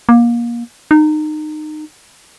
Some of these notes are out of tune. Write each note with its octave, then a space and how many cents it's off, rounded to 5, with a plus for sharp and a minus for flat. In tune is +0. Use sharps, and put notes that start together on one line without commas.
A#3 +25
D#4 -25